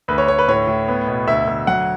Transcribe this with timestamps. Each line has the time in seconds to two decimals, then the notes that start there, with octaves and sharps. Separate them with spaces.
0.08 D2 B4
0.18 C#5
0.28 D2 C#5
0.39 B4
0.48 A2 C#5
0.68 A2
0.88 B3
1.08 B2
1.27 D2 E5
1.47 D2
1.67 F#3 F#5